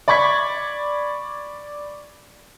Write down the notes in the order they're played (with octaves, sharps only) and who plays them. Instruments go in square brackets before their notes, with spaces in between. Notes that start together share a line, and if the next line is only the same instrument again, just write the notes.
[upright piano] D5 B5 C#6 G#6 B6